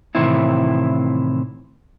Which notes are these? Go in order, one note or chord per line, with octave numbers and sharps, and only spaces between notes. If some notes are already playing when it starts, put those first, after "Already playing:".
A2 C3 D#3 E3 C4 E4